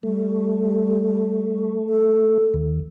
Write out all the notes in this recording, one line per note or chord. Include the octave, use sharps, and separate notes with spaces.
G3 A3
A4
D#2